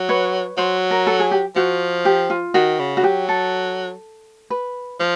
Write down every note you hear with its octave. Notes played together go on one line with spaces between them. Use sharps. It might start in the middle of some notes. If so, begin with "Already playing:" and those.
Already playing: F#3
B4 C#5
F#3 C5
A#4
A4
G#4
G4
F3 F#4
G4
F4
D#3 F#4
C#3
F#4
F#3 G4
A4
B4
F3 C5